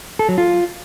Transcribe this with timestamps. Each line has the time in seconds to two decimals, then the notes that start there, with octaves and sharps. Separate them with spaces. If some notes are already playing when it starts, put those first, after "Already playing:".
0.19 A4
0.29 F#3
0.38 F4